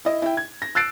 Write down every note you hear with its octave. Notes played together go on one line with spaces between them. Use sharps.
E4 D#5
E4 G5
G#6
A#6
E6 F#6 A6 C7 D7